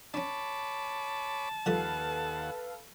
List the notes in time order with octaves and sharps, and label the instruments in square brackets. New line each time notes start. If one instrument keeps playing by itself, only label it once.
[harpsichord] C#4 D4 [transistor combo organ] C#5 B5 D6 [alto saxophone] A5
[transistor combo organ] D#2 F#5 [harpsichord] F3 G3 A3 [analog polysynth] A4 B4 F5